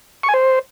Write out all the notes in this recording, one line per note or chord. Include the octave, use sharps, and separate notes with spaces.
C#6
G#5
C5